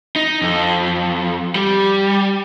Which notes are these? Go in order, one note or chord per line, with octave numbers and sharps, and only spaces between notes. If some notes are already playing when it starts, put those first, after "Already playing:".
D#4
F2
G3